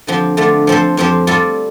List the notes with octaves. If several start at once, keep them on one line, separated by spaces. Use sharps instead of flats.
D3 F3 C4 G4
D3 A3 F4 D5
F3 C4 A4 C5
F2 F3 C4 G4 C5
G3 F4 A4 D5